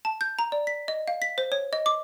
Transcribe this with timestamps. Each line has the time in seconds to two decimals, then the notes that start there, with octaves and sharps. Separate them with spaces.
0.05 A5
0.21 G6
0.39 A#5
0.52 D5
0.67 B6
0.88 D#5
1.08 F5
1.22 B6
1.38 C5
1.52 C#5
1.73 D#5
1.86 D6